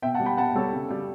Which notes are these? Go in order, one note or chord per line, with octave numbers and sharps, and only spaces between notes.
B2 E5 G5
F#5 A5
G3
G5 B5
B2 F#5 A5
G3 A4 C#5
C#3
G3